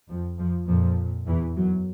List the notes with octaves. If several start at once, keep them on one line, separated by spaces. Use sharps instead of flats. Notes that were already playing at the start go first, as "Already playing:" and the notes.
F2 F3
F2 F3
F2 A#2 F3
E2 E3
F#2 F#3